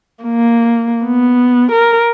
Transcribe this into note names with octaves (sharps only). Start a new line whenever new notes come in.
A#3
B3
A#4